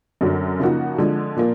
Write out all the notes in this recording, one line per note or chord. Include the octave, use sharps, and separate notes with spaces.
F#2 D3 F#3
C#3 F3 A#3 D#4 F#4
D3 F3 G#3
A#2 F3 A#3